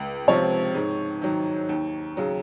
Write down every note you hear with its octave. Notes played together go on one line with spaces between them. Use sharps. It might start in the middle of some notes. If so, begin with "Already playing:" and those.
Already playing: C#2
C3 F3 C#5
G#2
D#3 F#3
D#2
C#3 F#3